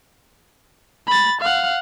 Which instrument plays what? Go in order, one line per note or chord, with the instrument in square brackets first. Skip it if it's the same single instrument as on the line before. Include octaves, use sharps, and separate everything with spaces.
[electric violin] B5 A6
F5 F#5